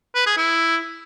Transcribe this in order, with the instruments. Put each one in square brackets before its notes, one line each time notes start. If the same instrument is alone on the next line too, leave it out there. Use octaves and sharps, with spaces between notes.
[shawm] B4
G#4
E4